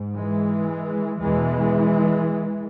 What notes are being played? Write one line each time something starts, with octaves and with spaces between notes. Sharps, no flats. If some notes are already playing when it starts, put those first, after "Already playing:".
Already playing: G#2
E3 G#3
E2 B2 E3 G#3